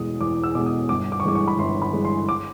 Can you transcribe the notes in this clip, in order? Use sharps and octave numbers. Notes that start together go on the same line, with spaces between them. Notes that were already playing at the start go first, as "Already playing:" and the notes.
Already playing: E2 B2 G#3 D#6
E2 D6
E6
B2 G#3 D6
D#6
G1 D6
D6
C#6
G2 E3 G#3 D6
C#6
B5
G1 C6
B5
G2 E3 G#3
C6
D6